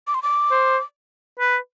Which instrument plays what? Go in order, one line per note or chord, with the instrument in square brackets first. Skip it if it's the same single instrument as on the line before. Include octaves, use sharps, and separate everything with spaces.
[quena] D6
C6
D6
[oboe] C5
B4